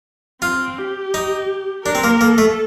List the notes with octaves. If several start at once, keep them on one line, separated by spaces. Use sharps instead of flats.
C4 F4
G4
D#4
D4 A#4
C4
A#3
A#3 A4
A3